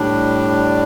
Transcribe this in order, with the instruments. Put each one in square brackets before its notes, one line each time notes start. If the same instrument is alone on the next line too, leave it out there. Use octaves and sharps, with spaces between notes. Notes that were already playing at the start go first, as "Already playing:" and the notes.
Already playing: [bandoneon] A2 G3 D4